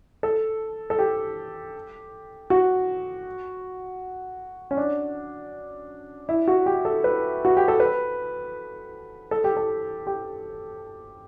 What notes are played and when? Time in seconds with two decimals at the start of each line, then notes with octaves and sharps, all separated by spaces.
0.23 A4
0.90 A4
0.99 G4
2.50 F#4
4.71 C#4
4.77 D4
6.29 E4
6.48 F#4
6.66 G4
6.85 A4
7.04 B4
7.45 F#4
7.57 G4
7.68 A4
7.80 B4
9.31 A4
9.44 G4
9.57 A4
10.07 G4